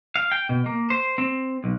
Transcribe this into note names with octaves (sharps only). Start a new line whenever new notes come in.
F5
G5
B2
A#3
C5
C4
B1